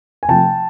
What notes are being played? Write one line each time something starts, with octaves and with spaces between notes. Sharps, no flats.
G#5
C3 F3 A3 G5 A5